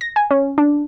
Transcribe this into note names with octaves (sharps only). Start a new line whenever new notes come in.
A#6
G#5
C#4
D4